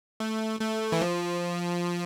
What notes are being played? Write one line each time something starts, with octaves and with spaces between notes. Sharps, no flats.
A3
A3
E3
F3